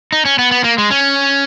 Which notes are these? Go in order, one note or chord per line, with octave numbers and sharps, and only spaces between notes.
D#4
C#4
B3
B3
A#3
G#3
C#4